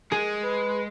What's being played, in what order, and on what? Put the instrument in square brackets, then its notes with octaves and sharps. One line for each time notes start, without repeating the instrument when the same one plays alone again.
[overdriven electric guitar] G#3 [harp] G#4
[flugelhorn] B4